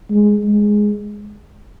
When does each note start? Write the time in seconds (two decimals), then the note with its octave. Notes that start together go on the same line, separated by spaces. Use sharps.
0.10 G#3
0.44 G#3